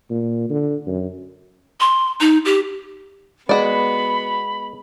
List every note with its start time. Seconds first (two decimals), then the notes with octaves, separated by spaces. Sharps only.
0.10 A#2
0.49 D3
0.87 F#2
1.80 C6
2.20 D#4
2.45 G4
3.49 G#3 B3 F#4 D5 B5